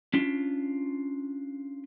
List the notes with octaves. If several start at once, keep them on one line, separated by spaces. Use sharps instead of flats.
C#4 D4 F4